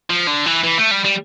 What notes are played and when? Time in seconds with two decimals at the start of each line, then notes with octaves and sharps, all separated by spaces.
0.10 F3
0.27 D3
0.46 E3
0.64 E3
0.78 A3
0.91 G3
1.04 G3